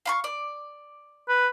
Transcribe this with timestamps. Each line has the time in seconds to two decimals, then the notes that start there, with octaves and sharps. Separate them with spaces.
0.06 F5 B5 C#6
0.24 D5
1.29 B4